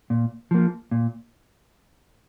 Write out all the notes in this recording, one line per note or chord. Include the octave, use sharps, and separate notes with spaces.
A#2
F3 A#3
A#2